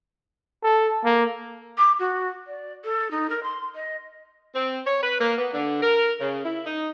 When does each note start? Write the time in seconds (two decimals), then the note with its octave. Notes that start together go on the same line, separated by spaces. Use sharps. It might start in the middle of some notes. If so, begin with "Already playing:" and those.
0.64 A4
1.05 A#3
1.78 D6
1.99 F#4
2.47 D5
2.85 A4
3.11 D#4
3.30 A#4
3.43 C6
3.75 D#5
4.55 C4
4.86 C#5
5.02 B4
5.20 A#3
5.38 B3
5.53 D3
5.83 A#4
6.20 C#3
6.44 E4
6.66 D#4